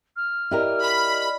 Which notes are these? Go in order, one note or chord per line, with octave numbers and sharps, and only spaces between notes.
F6
E4 G4 A#4 D5 D#5
B5